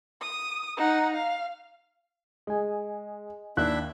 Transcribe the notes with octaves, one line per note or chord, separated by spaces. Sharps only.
D#6
D#4 F#5
F5
G#3 D#5 G#5
D#2 D4 E4 E5 F#6